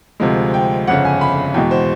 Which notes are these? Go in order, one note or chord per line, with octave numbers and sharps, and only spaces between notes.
D2 C3 F3 G#3
G5
G1 F2 C#3 F#5
G#5
B5
E2 B2 G#3 G5
C5